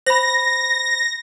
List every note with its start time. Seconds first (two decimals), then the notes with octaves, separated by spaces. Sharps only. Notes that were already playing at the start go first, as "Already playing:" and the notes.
0.06 C5 B5 A#6